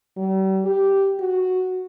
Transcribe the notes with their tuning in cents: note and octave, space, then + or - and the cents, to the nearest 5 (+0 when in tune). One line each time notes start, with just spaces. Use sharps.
G3 -45
G4 -5
F#4 -5